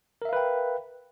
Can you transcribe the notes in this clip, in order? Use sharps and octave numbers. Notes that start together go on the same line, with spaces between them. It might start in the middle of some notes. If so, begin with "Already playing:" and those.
A#4 B4 E5 F5 G5